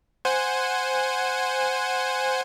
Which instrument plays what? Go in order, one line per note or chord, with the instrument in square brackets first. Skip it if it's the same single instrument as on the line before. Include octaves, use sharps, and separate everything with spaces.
[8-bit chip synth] C5 F#5 G#5